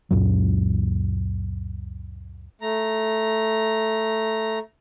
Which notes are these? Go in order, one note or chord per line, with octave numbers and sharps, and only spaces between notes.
C#2 F#2 A#2 F#3
A3 A#5